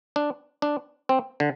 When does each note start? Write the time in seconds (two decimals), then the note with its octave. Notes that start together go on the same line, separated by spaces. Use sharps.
0.16 D4
0.62 D4
1.09 C4
1.40 D3